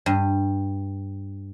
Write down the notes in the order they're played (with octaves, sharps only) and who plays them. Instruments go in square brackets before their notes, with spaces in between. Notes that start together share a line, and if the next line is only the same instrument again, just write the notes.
[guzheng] G2